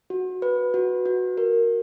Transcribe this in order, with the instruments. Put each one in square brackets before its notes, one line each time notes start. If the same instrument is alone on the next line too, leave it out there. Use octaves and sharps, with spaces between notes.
[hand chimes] F#4
B4
F#4
F#4
A#4